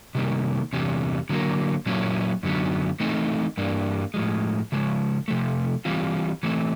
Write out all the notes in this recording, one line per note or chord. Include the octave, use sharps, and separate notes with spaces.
C3 D#3 G3 A#3
E2 C3 E3 G3
D3 F#3 A#3
A#2 F#3 A#3 C#4 E4
F#2 D3 F#3 B3 D#4
E3 A3 C4 D#4
G2 E3 G3 A#3 D4
A2 F3 G#3
C#3 F3 G#3
C3 F3 A3
E3 G3 C4 F4
E3 A3 C4